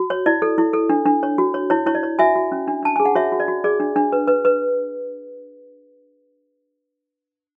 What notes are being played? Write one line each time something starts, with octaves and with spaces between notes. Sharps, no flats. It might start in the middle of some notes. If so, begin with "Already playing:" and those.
Already playing: F#4
C#5
E4 D5
A4
E4
A4
D4
D4
C#5
F#4
C#5
E4 C#5
E4 C#5
D5
C#5
F#4 E5 G#5
F#4
C#4
D4
D4 A5
G#4 G#5
F#5
F#4 C#5 E5
F#4
D5
F#4
G#4 D5
D4
D4
B4
B4
B4